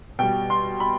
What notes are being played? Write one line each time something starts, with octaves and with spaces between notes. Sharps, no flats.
B2 G3 G5
C6
B5